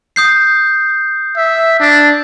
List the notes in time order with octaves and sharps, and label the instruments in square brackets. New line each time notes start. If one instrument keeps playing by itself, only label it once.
[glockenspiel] D#6 G6 C7
[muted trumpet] E5
D4